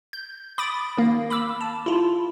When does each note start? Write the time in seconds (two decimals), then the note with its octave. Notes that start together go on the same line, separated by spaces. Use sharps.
0.13 G6
0.58 B5 D6 D#6 A6 D7
0.97 D#3 A#3
1.30 B5 D6 E6
1.61 A5
1.86 E4 F4